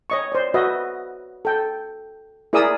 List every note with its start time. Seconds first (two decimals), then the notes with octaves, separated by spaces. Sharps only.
0.10 C#5 D#5 C#6
0.32 C5 D5
0.54 F#4 B4 D#5 E5
1.45 A4 G5
2.53 E4 G#4 A#4 D5 D#6 E6